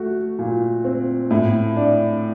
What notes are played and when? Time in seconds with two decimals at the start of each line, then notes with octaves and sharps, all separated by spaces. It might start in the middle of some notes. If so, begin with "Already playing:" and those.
Already playing: A3 F#4
0.39 A#2
0.84 C4
1.31 A2
1.76 D4